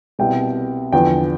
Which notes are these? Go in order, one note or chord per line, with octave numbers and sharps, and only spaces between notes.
C2 B2 G3 G5
E2 D3 F3 G5